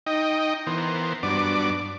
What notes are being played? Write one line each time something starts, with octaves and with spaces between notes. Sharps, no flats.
D#4 D#5 G5
E3 B3 A#4 C5
G2 F#3 B3 D4 D5 D6